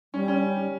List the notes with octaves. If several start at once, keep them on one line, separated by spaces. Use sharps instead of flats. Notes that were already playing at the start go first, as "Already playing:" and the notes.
G3 C#4
C#4